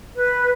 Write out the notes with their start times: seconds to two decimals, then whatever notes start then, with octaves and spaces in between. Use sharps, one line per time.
0.15 B4